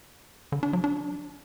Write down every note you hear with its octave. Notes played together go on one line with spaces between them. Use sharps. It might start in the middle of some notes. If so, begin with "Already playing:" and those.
D3
D4
F#3
D4